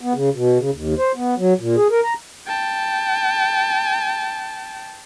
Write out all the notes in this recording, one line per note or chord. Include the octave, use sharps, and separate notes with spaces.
B3
C#3
B2
C#3
D#2
C5
B3
F#3
A#2
G#4
A#4
A#5
G5 A5